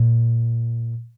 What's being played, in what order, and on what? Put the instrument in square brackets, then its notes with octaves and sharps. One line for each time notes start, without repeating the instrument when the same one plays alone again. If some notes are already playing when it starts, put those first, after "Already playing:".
Already playing: [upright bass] A#2